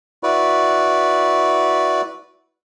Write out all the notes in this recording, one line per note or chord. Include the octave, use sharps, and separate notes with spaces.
E4 F#4 B4 D5